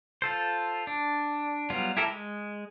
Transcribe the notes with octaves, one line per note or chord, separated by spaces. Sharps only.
F4 A4 C5
D4
F#3 G3 B3 F4
E4 G4 A4 A#4
G#3